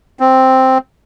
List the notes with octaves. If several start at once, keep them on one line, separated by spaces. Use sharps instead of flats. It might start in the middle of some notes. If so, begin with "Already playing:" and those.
C4